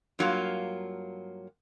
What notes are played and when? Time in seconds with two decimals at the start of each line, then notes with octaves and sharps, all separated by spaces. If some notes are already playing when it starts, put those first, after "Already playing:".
0.19 G2 F#3 A#3 F4